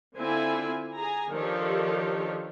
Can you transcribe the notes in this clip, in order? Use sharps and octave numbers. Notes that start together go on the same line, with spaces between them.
D3 C4 E4 F4 G#5
G#4 G#5 A#5
D#3 F3 D4 G4 A4 C#5